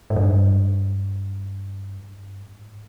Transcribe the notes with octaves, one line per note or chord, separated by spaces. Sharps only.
G#2
G2
F2
G2
G#2
G2
G#2